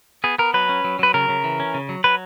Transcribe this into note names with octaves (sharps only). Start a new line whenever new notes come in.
B3 G#4
B3 A#4
F#3 B4
C#4
F#3
F#3 B4
C#3 A#4
C#3
E3
C#4
C#3
F#3
F#3 B4